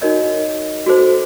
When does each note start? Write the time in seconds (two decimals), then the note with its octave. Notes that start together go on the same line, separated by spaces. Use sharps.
0.01 D#4 F#4 A#4 C#5 D#5
0.86 F#4 A4 C5